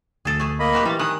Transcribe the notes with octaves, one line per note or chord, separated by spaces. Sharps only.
D2 G#4 A4
A3 G#4
A#3 D#5 B5
C4 F#4 G4
E3 G3 A6
D#3 G#5 D#6 F#6